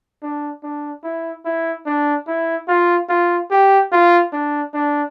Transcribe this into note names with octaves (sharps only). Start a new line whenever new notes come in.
D4
D4
E4
E4
D4
E4
F4
F4
G4
F4
D4
D4